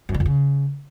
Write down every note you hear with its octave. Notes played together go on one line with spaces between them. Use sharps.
F#2
D3
F2
C#3